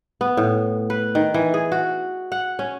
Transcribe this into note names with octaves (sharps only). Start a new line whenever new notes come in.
B3
A2
B4
D#3
E3
G#4
F#4
F#5
C#4